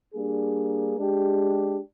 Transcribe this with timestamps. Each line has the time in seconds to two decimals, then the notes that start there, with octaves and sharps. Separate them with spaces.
0.14 G3 A#3 D4 G#4
0.97 G#3 D4 G4